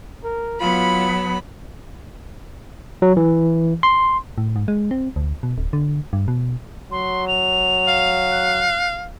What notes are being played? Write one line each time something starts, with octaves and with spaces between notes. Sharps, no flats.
A#4
F#3 B3 F4 B5
F#3
E3
C6
A2
G#2
G#3
C4
D2
B2
D1
D3
G2
B2
F#3 C6
F7
F5
F#6